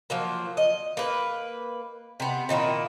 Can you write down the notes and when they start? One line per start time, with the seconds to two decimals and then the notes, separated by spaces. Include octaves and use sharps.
0.10 F3 F#3 A#3
0.57 D#5
0.97 A#3 B4
2.20 C3 B3
2.49 A#2 D#3 A#3 E4